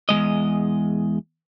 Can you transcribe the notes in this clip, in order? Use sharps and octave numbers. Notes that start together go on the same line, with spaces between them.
E2 E3 G#3 D#5